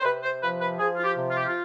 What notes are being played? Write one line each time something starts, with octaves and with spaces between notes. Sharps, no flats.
C5
C3 B4
C5
F3 B4
B4
F3 G#4
F4
G4
C3
F4
G4
F4